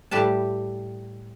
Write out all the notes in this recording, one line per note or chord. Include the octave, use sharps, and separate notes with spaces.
A2 G3 G4 B4 A5